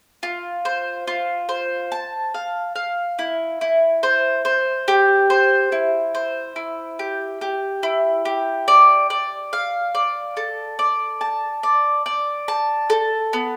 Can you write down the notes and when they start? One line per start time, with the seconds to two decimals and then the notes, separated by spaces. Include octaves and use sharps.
0.23 F4
0.65 C5
1.08 F4
1.49 C5
1.92 A5
2.34 F5
2.75 F5
3.19 E4
3.61 E4
4.03 C5
4.45 C5
4.88 G4
5.30 C5
5.72 E4
6.15 C5
6.56 E4
6.99 G4
7.41 G4
7.83 E4
8.25 G4
8.68 D5
9.10 D5
9.53 F5
9.95 D5
10.37 A4
10.79 D5
11.21 A5
11.63 D5
12.06 D5
12.48 A5
12.90 A4
13.33 B3